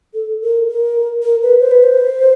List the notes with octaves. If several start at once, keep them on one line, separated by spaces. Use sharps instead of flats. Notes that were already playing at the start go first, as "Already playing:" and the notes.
A4
A#4
A#4
A#4
B4
C5
B4
C5